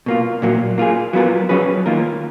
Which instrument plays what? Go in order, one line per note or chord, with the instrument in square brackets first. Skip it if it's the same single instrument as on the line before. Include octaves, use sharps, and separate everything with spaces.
[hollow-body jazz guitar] B2 A#3 F4
A#2 F#3 A#3
A#3 F4 G#4
F#3 B3 F4 A#4
F#3 C#4 G#4 B4
D#3 A#3 F4 A#4